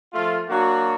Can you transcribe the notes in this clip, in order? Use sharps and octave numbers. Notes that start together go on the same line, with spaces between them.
F3 A3 F4
F#3 A#3 D4 F#4